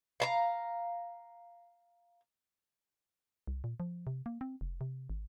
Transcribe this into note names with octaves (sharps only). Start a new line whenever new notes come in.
F5 A5 A#5
C2
A#2
F3
C3
A#3
C4
F1
C3
G#1